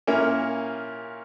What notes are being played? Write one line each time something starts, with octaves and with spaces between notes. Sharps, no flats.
A#2 A#3 C#4 E4 A#4